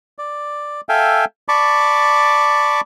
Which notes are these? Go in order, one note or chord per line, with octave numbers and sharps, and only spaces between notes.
D5
A4 E5 F5 G5 G#5
D5 A5 B5 C#6 D6